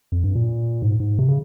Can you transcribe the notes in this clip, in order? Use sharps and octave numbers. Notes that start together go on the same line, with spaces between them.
F2
G2
A#2
G#2
G#2
C3
C#3